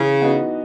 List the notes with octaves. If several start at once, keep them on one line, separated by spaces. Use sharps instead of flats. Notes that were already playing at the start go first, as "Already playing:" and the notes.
Already playing: C#3 E3
B3 D#4 F#4